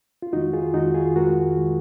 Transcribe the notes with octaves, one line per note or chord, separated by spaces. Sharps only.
F4
F2 D#3 G#3 D#4 F#4
F4 G#4
F2 D#3 G#3 D#4 F#4
F4 G#4
F2 D#3 G#3 F#4 A#4
D#3 G#3